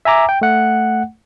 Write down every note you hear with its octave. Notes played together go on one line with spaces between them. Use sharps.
E5 G#5 A#5 D6
G5
A3 F#5